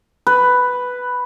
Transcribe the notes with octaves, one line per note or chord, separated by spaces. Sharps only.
B4